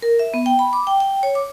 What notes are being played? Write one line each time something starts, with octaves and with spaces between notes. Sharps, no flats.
A#4
E5
B3
G5
B5
D6
G5
G5
C#5
D6